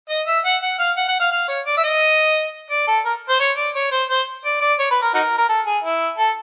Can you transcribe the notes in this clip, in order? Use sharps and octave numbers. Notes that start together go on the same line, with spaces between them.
D#5
E5
F#5
F#5
F5
F#5
F#5
F5
F5
C#5
D5
E5
D#5
D5
A4
A#4
C5
C#5
D5
C#5
C5
C5
D5
D5
C#5
B4
A#4
D#4 F#4 A#4
A#4
A4
G#4
E4
A4